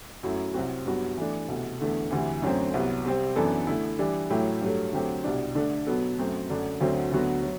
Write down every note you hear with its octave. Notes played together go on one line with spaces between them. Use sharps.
F#2 F#3 A3 E4
C2 C3 F#3 C4 F#4
G2 F#3 B3 F#4
E3 A3 D4
C2 B2 A3
E2 D3 A3
D2 C3 E3
F#2 D3 F#3 A3 C4
C2 C3 F#3 B3
C3 G3 C4
F#2 E3 B3 D4 A4
D3 A3 E4
E3 G3 D4
A2 F#3 A3 E4 G4
G2 F#3 A3
D3 F#3 A3 C4 G4
C2 B2 G3 D4
D3 A3 D4 A4
B2 F#3 B3 F#4 A4
F#2 F#3 A3 C4
F#2 D3 A3 D4
D2 D3 F#3 C4 F#4
D2 D3 F#3 B3 F#4
F#3